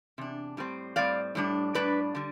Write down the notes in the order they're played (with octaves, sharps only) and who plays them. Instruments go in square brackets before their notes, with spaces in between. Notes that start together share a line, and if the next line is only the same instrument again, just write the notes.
[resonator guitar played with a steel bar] E2 C3 D4
A2 G3 C4
A2 G3 C4 D5 F5
A2 G3 D4
A2 G3 D4 B4 D5
D3 G3